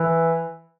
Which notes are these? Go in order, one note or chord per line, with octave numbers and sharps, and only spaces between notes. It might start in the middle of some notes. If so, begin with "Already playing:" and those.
Already playing: E3